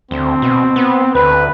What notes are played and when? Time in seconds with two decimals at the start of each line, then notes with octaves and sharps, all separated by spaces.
0.11 D2 C4
0.42 B2
0.76 B3
1.15 D2 B4